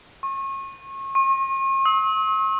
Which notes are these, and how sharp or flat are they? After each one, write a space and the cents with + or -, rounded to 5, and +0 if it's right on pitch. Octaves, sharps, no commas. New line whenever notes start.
C#6 -35
C#6 -45
E6 -45